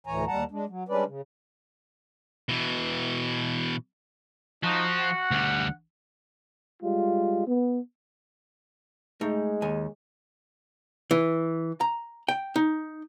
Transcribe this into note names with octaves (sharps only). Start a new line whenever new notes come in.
D2 A2 E3 C#5 G#5 A#5
D#2 G3 F#5 A5 A#5
G#3 D4
F#3
G3 G#3 C#4 D4 B4 D5
C#3
B2 E3
F3 D#4 F#4
F#5
D2 G3
G3 G#3 F4
B3
G#3 A3 D#4
D#2 G#5
E3
A#5
G5
D#4